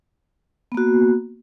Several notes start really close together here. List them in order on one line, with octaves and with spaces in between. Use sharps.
B3 A#3 F#4